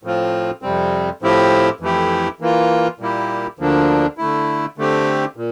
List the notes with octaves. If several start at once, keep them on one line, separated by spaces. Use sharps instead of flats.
A2 F3 C4 F4
F2 C3 G3 C4
A2 F3 C4 E4 G4
F2 E3 A3 E4 G4
E3 A#3 F4
A#2 G3 A#3 E4 G4
D2 D3 F3 A#3 D4
D3 A3 E4
D3 A3 C4 G4
A#2